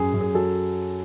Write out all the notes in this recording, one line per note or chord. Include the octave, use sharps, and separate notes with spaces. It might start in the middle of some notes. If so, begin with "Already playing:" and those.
Already playing: F#2 G#4
F#2
G#4
F#3 A4